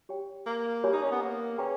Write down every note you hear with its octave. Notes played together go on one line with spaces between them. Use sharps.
G4 C#5 G5
A#3
G4 A#4 C#5 G#5 B5
D#4
C#4
B3
A#3
C#4 G#4 B4 G5 A#5